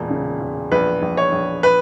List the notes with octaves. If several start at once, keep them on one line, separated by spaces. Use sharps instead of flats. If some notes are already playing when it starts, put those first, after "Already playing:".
Already playing: E1 A#2
C#3
E1
A#1 B4
A#1
C#5
A#1
B4